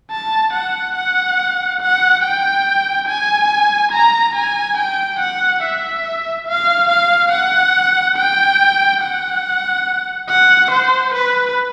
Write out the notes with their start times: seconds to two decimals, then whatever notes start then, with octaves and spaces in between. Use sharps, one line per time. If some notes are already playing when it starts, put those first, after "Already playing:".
0.11 A5
0.53 F#5
0.96 F#5
1.81 F#5
2.23 G5
3.08 G#5
3.92 A#5
4.35 G#5
4.77 G5
5.20 F#5
5.63 E5
6.47 F5
6.89 F5
7.32 F#5
8.17 G5
9.02 F#5
10.29 F#5
10.71 C5
11.14 B4